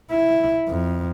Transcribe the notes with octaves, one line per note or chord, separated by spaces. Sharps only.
E4
F2